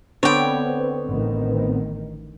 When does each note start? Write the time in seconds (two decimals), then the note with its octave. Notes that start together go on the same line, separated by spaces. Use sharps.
0.23 D3 B3 C4 C#5 D5 G5
1.08 A1 D#3